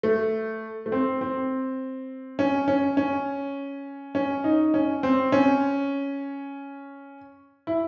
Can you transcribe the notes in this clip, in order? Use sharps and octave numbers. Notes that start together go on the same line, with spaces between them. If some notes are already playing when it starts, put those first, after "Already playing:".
A3
A3
C4
C4
C#4
C#4
C#4
C#4
D#4
C#4
C4
C#4
E4